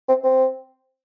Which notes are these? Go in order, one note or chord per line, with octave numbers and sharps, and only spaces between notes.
C4
C4